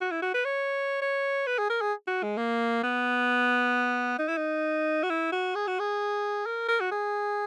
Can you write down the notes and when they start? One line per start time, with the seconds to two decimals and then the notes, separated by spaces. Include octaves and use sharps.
0.01 F#4
0.11 E4
0.22 F#4
0.34 B4
0.45 C#5
1.02 C#5
1.47 B4
1.59 G#4
1.70 A#4
1.82 G#4
2.08 F#4
2.23 G#3
2.37 A#3
2.83 B3
4.19 D#4
4.28 E4
4.37 D#4
5.03 F#4
5.10 E4
5.33 F#4
5.55 G#4
5.67 F#4
5.79 G#4
6.46 A#4
6.68 A#4
6.81 F#4
6.92 G#4